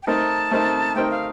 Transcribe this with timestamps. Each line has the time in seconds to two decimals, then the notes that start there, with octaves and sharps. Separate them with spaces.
0.03 G5
0.07 A3 C4 D#4 A#4 A5
0.51 A3 C4 D#4 A#4
0.95 A3 C4 D#4 A#4 G5
1.11 F5